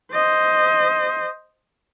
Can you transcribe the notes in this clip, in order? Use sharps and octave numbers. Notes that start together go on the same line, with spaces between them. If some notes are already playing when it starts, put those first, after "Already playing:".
C5 D#5